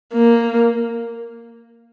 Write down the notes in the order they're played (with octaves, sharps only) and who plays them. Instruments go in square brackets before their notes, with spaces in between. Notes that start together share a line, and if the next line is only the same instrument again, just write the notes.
[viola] A#3